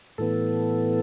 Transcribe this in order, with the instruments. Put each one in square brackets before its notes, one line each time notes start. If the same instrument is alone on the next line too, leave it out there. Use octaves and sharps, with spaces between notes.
[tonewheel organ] A2 E3 B3 A4